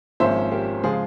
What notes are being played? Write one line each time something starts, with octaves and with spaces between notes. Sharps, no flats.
G#1 G#2 F3 A#3 C#4 C5 E5
G4 A#4
C#3 F3 G#3 F4 G#4